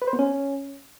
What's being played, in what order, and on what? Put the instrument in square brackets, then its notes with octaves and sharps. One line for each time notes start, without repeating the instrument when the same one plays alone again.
[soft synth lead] B4
C5
B3
C#4